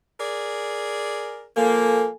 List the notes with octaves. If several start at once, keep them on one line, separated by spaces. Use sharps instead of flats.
G#4 A#4 D5
F3 A#3 A4 G#5